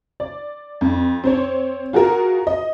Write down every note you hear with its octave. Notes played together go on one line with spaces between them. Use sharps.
D5
F2
C4 C5 C#5
F4 F#4 G#4 A#4
D#5